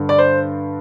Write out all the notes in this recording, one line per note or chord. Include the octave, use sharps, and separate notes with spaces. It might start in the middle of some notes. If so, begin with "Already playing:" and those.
Already playing: G2 D3
D5
C5